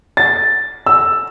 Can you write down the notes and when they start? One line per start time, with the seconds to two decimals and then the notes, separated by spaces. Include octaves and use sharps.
0.17 A6
0.86 E6